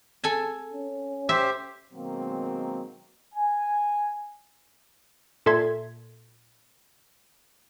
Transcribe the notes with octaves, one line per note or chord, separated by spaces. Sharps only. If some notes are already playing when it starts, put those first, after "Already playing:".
A4 G#5 A5
C#4
G4 C5 E5
B2 D#3 F#3 G#3 A#3 C4
G#5
A#2 A4 E5 C6 G#6